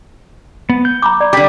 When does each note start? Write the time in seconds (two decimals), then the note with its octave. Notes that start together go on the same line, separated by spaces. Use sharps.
0.70 B3
0.85 G6
1.02 A#5 B5 D6
1.21 D5
1.33 D3 G3 D6